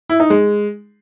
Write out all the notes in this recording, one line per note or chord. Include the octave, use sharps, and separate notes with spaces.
E4
D#4
G#3